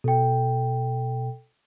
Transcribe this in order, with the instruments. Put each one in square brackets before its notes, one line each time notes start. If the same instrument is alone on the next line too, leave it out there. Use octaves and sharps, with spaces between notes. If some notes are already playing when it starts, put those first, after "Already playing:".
[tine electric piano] B2 [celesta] A4 G5